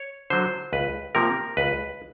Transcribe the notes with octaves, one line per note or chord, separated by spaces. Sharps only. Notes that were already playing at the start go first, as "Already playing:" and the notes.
Already playing: C#5
D3 F#3 C5
C#2 B4
C3 F3 A#3 A#4
C#2 B4